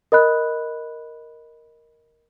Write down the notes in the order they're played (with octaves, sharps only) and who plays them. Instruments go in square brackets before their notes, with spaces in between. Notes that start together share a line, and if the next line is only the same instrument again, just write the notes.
[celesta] A#4 D#5 B5 F#6